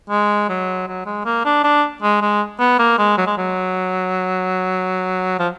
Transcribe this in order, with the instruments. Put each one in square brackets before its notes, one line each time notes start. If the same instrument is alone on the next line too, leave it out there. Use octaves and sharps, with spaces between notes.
[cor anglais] G#3
F#3
F#3
G#3
A#3
D4
D4
G#3
G#3
B3
A#3
G#3
F#3
G#3
F#3
F3